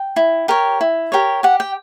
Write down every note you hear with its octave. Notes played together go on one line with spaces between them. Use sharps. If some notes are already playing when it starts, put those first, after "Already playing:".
Already playing: G5
E4
G4 A#4 C#5
E4
G4 A#4 C#5
G4 F#5
G5